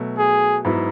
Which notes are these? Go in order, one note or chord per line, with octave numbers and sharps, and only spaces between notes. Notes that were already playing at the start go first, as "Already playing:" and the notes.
Already playing: B2 F#3 A3
G#4
G#2 F#3 B3 E4